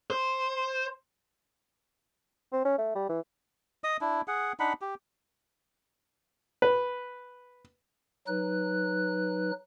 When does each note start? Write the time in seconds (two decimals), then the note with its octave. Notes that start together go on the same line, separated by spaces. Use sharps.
0.10 C5
2.53 C4
2.65 C#4
2.78 A3
2.95 G3
3.09 E3
3.84 D#5 D#6
4.01 D4 E4
4.28 G#4 F#5
4.60 D4 D#4 F#5 B5
4.81 G4
6.62 B4
8.27 F#3 D#4 B4 F#6